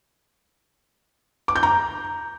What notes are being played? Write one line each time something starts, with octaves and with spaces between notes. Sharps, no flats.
D6
G6
A#5